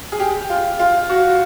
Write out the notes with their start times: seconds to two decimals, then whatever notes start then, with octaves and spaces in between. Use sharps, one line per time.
0.12 G#4
0.20 G4
0.50 F4
0.79 F4
1.09 F#4